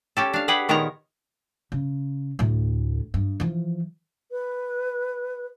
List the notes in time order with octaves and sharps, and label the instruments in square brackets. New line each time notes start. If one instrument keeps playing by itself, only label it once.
[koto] C#4 G4 A4
D4 F5
G4 G#4 B4 F#5
A#2 D#3 B3 A#4 C#5 A#5
[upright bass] C#3
D2 A2
G2
E3 F3
[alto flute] B4